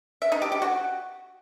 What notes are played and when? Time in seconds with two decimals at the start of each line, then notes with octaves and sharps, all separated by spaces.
0.22 E5
0.32 D#4
0.42 G4
0.52 G4
0.62 F#4